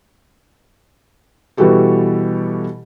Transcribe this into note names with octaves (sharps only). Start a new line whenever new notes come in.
B2 E3 G3 F#4 G4 A4